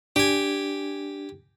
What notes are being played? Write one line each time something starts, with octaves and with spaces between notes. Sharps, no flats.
D4 G4 G#5